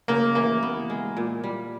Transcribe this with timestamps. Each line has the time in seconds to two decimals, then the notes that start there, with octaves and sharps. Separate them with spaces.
0.08 C#3 A#3
0.35 E3 A#3
0.63 B3
0.90 G#3
1.17 A#2
1.44 G3